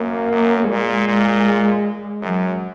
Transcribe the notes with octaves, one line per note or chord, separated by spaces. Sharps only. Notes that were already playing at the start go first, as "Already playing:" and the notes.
Already playing: F#2 A#3
F#2
A#2 G#3
A#2
F#2 F#3